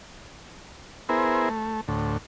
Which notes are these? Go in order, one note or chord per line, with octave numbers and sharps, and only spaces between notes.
B3 E4 G#4 A#4 C5
A3
D2 A2